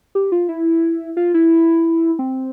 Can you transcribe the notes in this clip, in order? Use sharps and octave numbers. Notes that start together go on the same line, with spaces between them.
G4
F4
E4
F4
E4
C4